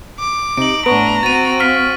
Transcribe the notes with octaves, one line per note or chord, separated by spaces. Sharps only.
D6
C3 D#4 D7 F#7
A2 B3 D4 A#5 C#6 D7
C4 F#4 A6 D#7
F5 F6 B6 D#7